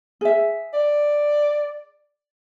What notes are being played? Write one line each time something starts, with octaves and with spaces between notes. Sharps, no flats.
G#4 E5
D5